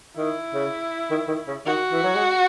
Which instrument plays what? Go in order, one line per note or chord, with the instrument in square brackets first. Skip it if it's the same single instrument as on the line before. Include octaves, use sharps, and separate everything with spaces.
[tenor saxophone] D#3 [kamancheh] E4
[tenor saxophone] C#3
D#3
D#3
C#3
[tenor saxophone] D#3 [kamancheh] F#4
[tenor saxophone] E3
F#3
G#3